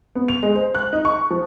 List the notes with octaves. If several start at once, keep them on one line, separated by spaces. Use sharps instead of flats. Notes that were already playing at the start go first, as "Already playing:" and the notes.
B3
F7
G#3
C5
F#6
D#4
C#6
F3